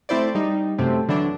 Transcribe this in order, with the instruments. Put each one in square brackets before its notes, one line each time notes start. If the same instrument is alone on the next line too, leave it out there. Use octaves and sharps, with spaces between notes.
[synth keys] A3 C4 E4 C5 D5
G3 D#4
F#2 C3 A3 C4
D3 E3 F#3 D4